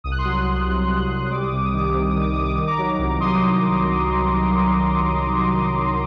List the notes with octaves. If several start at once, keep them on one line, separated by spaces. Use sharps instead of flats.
C2 D#6
F#6
C6 D#6
F#3
C2
C2
C2
C2
G3 D6
D#6
C3 D6
D#6
D#3 D6
D#6
C3 D6
D#3 D#6
D6
D#3 D#6
D6
D#3 D#6
A#5 D6
F#3
C2
C2 C6 D#6